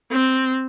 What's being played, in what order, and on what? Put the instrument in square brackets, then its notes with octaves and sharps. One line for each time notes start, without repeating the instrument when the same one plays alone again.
[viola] C4